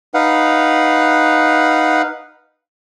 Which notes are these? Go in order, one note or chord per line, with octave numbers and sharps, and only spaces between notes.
D#4 B4 F5 F#5